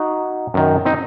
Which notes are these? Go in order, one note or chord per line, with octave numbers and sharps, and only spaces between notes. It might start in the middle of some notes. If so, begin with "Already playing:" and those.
Already playing: D#4 F#4
F#2 D#3
C4 D#4